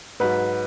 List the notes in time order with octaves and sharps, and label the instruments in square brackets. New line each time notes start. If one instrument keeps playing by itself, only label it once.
[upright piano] G#2 F#3 B4